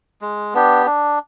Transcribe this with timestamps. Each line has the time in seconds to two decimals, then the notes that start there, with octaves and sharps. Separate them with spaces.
0.21 G#3
0.54 B3 D4 G4
0.86 D4